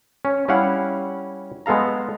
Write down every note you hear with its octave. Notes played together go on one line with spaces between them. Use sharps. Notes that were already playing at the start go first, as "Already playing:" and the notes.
C#4
G3 C#4 E4 F5 F#5
G#3 B3 A4 F5 A#5